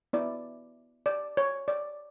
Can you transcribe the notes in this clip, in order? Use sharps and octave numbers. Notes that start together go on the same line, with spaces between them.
B3 E4 D5
D5
C#5
D5